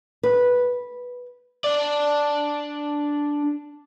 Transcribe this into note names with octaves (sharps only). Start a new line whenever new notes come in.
B4
D4 D5